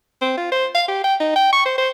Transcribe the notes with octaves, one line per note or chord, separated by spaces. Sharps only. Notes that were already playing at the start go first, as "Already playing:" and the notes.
C4
F4
C5
F5
G4
G5
D#4
G5
C#6
C5
C5